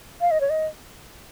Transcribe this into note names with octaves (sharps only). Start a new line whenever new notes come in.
F5
D#5
C#5
D#5